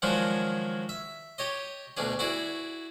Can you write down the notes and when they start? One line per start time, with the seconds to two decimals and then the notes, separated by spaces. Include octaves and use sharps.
0.02 D#3 F3 F#3 G#3 D4 F#4
0.89 E5
1.38 G4 C#5 D#5
1.97 D2 B2 D4 G#4
2.19 E4 F#4 G#4 D5